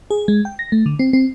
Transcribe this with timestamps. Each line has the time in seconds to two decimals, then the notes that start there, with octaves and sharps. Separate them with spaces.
0.10 G#4
0.28 G#3
0.45 G5
0.59 A#6
0.72 A3
0.86 D3
0.99 C4
1.13 C4